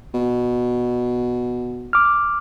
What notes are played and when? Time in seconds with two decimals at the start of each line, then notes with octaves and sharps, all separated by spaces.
0.14 B2
1.93 D6 F6